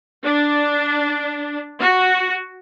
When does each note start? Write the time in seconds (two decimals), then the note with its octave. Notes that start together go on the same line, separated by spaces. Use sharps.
0.25 D4
1.81 F#4